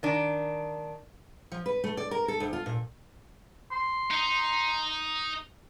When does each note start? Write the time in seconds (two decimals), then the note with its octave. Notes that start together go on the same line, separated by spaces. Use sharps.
0.03 D#3 D4
1.52 F3
1.66 B4
1.84 A3
1.97 D5
2.11 A#4
2.28 A4
2.40 D2
2.53 F4
2.66 A#2
3.72 C6
4.11 D#4